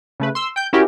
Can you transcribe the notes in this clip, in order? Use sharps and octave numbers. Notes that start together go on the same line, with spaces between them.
C#3 A3 B4
C6 E6
G5 G6
C#4 E4 F#4 G4 A#4